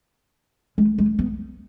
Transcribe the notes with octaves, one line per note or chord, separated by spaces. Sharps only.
G#3
G#3
B3